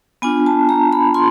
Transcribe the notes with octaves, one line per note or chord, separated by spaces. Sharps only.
B3 D4 F4 G#5
A5
A#5
B5
F4 C6